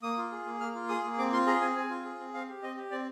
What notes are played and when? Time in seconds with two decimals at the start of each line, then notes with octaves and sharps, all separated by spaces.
0.03 A#3 D#6
0.18 F4
0.32 G#4
0.46 A#3
0.60 A#3 F6
0.75 F4
0.89 G#4 D#6
1.04 A#3
1.18 C4 D6
1.32 F4 C6
1.47 G#4 A#5
1.61 C4 G#5
1.76 C4 G#5
1.90 F4
2.05 G#4
2.19 C4
2.34 C4 F5
2.49 G4
2.62 C4 D#5
2.77 G4
2.91 C4 D5